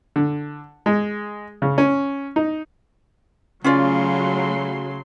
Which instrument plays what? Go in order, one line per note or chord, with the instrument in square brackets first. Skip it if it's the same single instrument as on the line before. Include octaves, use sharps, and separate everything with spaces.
[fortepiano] D3
G#3
C#3
C#4
D#4
[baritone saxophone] C#3 [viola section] F#3 A3 C6 [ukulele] C#4 F4 D5